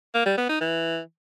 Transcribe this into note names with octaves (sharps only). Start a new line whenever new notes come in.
A#3
G3
B3
D#4
E3